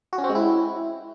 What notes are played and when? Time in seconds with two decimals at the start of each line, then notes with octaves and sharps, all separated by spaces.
0.13 F#4
0.18 C#4
0.24 C4
0.29 G#3
0.35 E4